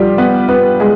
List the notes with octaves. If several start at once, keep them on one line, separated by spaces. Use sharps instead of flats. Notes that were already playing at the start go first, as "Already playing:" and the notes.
Already playing: F1 F2 D3 F3 G3 F4 G4
B3 B4
B3 B4
G#3 G#4